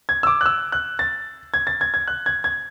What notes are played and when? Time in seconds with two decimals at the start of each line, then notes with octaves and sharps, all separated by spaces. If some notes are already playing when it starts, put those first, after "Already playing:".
0.09 G#6
0.23 E6
0.27 D6
0.41 F#6
0.46 E6
0.72 F#6
0.99 A6
1.54 G#6
1.67 A6
1.81 G#6
1.94 G#6
2.08 F#6
2.26 G#6
2.44 G#6